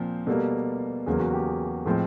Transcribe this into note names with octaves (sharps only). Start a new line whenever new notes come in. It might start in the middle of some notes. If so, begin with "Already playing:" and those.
Already playing: A#2 F3 C4
B2 G3 A#3 A4
E2 C#3 F#3 A#3 G#4
F#4
G4
G#4
A2 F3 G#3 C4